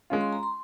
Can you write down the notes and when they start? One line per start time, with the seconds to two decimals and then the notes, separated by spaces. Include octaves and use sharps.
0.10 G#3 C#4 F4
0.21 C6
0.33 A#5
0.43 C6